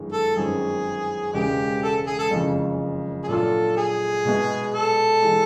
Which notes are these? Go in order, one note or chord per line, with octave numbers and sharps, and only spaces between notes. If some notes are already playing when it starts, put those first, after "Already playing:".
Already playing: G1 F#2 D#3 G#3
A4
G1 F#2 D#3 G#3 C4 G#4
E1 E2 C#3 E3 G#3 G4
A4
G#4
A4
F#1 F2 C#3 E3 G#3
G#4
A#2 F#3 A3 D4 F4 A4
G#4
B2 G#3 B3 E4
A4
E3 G#3